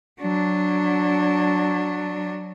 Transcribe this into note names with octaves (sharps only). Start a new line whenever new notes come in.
F#3 D4